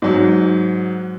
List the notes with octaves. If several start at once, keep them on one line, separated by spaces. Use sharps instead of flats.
G#2 F#3